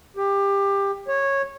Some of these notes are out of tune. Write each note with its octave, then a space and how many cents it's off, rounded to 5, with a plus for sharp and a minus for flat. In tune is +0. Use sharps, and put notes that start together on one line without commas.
G4 +20
C#5 -10